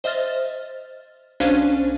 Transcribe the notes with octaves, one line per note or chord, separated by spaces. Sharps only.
C5 D#5 E5 F6 A6
B1 C#4 D4 C5 F5 D#7